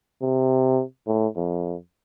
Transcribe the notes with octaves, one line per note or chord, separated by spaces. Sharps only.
C3
A2
F2